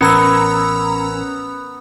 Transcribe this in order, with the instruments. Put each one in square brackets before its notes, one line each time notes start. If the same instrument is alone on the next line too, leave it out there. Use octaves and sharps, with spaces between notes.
[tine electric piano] A1 A#4 [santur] B3 [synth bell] C#4 A#5 E6